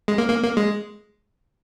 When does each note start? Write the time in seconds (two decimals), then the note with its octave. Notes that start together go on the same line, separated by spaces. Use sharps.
0.08 G#3
0.18 A#3
0.30 A#3
0.43 A#3
0.57 G#3